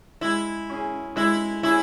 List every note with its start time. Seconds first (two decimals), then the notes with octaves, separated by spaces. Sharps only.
0.21 G#3 E4
0.70 C#4 G#4
1.16 G#3 E4
1.63 C#4 E4 G#4